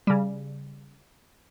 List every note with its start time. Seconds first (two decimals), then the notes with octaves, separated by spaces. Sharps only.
0.07 C#3 G3